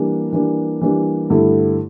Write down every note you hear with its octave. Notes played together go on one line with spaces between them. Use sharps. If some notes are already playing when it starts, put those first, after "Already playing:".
Already playing: E3 G3 A#3 D4
E3 G3 A#3 D4
E3 G3 A#3 D4
G2 D3 A3 E4